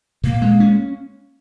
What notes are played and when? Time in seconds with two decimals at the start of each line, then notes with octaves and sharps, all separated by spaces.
0.24 A#2 A#3
0.42 G#3
0.60 C#4